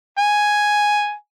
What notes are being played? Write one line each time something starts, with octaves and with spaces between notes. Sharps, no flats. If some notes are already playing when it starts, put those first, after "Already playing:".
G#5